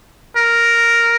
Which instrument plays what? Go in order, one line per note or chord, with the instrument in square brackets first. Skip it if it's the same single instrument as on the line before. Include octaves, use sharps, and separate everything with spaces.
[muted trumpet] A#4